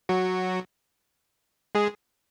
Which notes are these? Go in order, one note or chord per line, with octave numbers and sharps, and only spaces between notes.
F#3 F#4
G#3 G#4